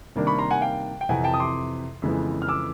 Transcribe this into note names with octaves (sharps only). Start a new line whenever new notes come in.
C3 D#3 G3 A#3 D4
B5 C#6
A#5 C6
F#5 G#5
F5 G5
G5
F2 C3 E3 F#5 G#5
G5 A5
D#6
C6 D6
F2 C#3 E3 G#3 B3
F6
D6 E6